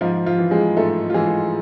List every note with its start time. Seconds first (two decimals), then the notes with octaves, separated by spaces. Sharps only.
0.01 G#2 F3 F4
0.26 F3 F4
0.38 E3
0.51 G#3 G#4
0.77 G#2 A3 A4
1.10 F4
1.14 E3 G#3 G#4